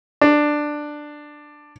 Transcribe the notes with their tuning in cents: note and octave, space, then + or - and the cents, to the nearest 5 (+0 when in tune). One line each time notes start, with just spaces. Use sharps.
D4 +10